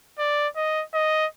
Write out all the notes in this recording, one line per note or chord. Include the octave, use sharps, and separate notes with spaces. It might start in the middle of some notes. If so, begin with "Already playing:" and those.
D5
D#5
D#5